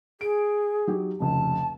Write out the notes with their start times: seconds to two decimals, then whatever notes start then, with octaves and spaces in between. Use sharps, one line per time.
0.21 G#4 D7
0.87 F#3 D#4 G4
1.20 F1 C#2 A5